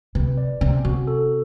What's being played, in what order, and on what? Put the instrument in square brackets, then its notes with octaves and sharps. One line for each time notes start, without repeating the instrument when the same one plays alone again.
[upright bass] C3 [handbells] B4
[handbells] D5
[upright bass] C3 [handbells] C#4
[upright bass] C3 [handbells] F#4
[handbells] A4